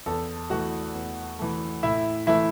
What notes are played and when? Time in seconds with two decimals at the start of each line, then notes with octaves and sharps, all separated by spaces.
0.06 E2 A4 A5
0.50 E3 A3 F#4 F#5
0.95 E2
1.39 E3 A3
1.83 A2 E4 E5
2.27 E3 A3 E4 E5